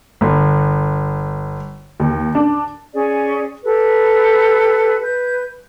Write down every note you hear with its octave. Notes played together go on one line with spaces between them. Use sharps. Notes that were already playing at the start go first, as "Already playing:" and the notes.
G1
D#2
D4
C#4 G#4 D5
G4 A4 B4
B4 G6